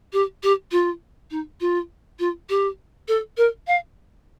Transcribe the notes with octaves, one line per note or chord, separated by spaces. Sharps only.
G4
G4
F4
D#4
F4
F4
G4
A4
A#4
F5